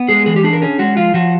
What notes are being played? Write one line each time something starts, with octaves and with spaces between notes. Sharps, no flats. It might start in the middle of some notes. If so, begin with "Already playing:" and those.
Already playing: B3
G#3 G#4
E3 G#4
G4
D4 G#4
A#4
C#4 G#4
G#3 F#4
F3 F4
F3 F#4